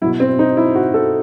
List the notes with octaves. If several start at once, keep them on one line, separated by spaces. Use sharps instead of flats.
B2 F#3 E4
C4
D#4
E4
F#4
A4